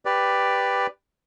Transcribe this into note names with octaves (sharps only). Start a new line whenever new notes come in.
G4 B4 D5